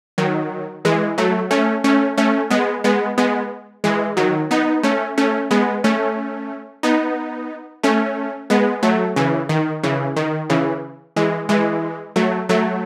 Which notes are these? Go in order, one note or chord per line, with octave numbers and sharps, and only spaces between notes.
D#3 F#3
E3 G#3
F#3 A3
A3 C#4
A3 C#4
A3 C#4
G#3 B3
G#3 B3
G#3 B3
E3 G#3
D#3 F#3
B3 D#4
A3 C#4
A3 C#4
G#3 B3
A3 C#4
B3 D#4
A3 C#4
G#3 B3
F#3 A3
C#3 E3
D#3
C#3 E3
D#3
C#3 E3
E3 G#3
E3 G#3
F#3 A3
F#3 A3